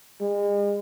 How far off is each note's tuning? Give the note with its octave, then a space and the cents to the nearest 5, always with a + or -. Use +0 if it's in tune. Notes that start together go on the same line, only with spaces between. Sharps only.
G#3 -40